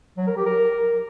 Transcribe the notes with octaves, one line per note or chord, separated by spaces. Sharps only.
F#3
A#4
G4
A#4